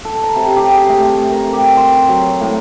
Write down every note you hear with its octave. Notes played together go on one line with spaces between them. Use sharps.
A4
A#5
C3
G4
G#4
A3
C4
A#4
G4
C6
F#3
A2